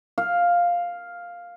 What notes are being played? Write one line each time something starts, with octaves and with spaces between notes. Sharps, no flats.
F5